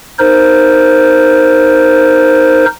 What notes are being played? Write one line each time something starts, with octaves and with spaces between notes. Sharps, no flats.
D#4 A#4 C5